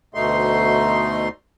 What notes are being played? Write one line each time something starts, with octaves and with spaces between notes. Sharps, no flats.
D2 B2 A3 D#4 C6